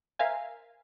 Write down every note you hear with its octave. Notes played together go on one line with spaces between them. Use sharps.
A#4 C5 E5 F5 G#5